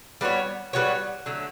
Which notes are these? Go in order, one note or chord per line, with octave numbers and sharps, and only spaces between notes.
G3 B3 F#4 C#5
G3 B3 F#4 C#5
D3 F#3 A3